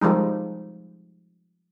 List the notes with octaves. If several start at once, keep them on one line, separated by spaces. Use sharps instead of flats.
F3 G3 G#3 D#4